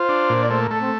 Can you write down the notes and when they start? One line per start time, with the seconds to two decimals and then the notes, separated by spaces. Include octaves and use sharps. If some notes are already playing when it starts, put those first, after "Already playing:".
Already playing: F4 C5
0.09 D4
0.30 A#2
0.43 D5
0.50 A3 C5
0.61 A#4
0.71 A3 A4
0.81 C4